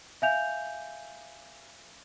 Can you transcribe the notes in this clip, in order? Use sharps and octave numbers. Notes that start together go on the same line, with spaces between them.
E5 F5 G#5 G6 F7